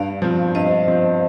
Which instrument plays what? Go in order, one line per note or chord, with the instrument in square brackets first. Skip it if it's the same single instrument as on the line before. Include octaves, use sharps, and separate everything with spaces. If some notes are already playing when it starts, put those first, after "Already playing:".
Already playing: [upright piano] G2 [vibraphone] D5 F5
[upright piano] F3 C4
[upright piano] G2 [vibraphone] C5 D#5
[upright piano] F3 C4